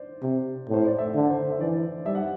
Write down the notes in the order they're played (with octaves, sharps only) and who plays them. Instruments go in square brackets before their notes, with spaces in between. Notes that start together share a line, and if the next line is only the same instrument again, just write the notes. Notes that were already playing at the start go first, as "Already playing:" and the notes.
Already playing: [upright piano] C5 D5
[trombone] C3
A2
[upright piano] C5
D5
E5
[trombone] D3
[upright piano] C5
E5
[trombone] E3 [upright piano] D5
[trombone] G3 [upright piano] E5
[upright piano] F#5